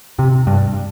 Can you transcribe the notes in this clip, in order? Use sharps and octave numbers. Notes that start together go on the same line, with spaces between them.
C3
G2